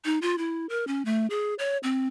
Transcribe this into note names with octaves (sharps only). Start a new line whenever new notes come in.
D#4
F4
E4
A#4
C#4
A3
G#4
C#5
C4